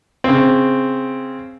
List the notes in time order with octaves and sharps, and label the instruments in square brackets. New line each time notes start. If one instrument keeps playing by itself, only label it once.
[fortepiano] C#3 C4